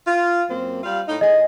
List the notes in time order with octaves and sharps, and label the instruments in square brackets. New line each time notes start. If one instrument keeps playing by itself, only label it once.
[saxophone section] F4
F#2 A#3 C4
G3 F4 F5
A2 D#4
[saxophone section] A2 G#4 [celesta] D#5